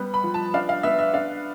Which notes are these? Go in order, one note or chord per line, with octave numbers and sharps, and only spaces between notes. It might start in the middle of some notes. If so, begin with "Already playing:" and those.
Already playing: G3 B3
B5
F3
A5
D4 F5
F5
B3 E5
E5
D4 F5